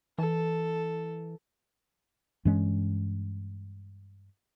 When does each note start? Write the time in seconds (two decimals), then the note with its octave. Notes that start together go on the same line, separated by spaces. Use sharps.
0.18 E3 A4
2.45 G2 E3 G#3 C#4